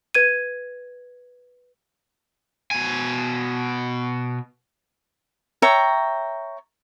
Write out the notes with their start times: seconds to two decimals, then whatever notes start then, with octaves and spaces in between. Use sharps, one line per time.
0.15 B4 G#6 D#7
2.71 B2 G#5
5.62 C#5 E5 G5 A#5